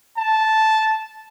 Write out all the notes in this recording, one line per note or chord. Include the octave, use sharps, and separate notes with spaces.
A5